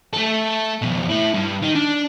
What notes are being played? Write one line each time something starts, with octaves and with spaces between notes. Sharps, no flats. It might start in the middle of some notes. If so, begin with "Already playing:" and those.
A3 A4
F2 B2
A2 E4
G2
D#3 D#4
D4